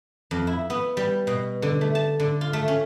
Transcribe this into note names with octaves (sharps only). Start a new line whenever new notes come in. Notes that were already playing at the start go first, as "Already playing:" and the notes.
F2
E4
B3
G3
B2
D3
A3
A5
D3
F4
A3
C#4